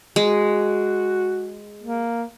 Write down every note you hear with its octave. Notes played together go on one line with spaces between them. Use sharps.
G#3 F#4
A#3